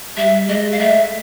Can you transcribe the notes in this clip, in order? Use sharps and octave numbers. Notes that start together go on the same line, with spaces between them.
G3 E5
G#3 D#5
F5
A3 E5